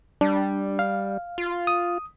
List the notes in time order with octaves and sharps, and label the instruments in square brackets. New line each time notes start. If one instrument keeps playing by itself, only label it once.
[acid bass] G3 [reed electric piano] D4
[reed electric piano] F5
[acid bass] F4
[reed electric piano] D#6